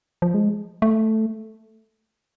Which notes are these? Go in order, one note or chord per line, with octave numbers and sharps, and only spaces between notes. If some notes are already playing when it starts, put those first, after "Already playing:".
F3
G#3
A3